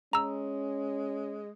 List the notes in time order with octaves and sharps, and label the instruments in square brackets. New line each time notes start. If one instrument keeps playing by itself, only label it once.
[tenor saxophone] G#3 [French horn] C#4 [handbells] A#5 E6